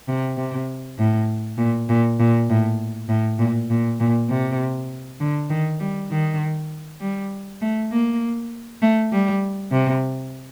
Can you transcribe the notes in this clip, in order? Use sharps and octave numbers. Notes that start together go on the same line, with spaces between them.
C3
C3
A2
A#2
A#2
A#2
A2
A2
A#2
A#2
A#2
C3
D3
D#3
G3
D#3
G3
A3
A#3
A3
G3
C3